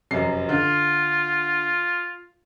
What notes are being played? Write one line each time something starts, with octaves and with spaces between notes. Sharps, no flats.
F1 F#2 C7
D3 F4